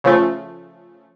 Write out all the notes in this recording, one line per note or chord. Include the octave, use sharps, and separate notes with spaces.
C#3 F3 A3